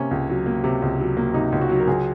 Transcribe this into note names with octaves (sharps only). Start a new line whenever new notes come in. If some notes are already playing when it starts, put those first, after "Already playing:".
Already playing: C3 A#3 C#4
C#2
F#3
A#3
C3
C#2
F#3
A#3
C3 D#4
C#2
F#4
F#3
A#4
C#2 G#4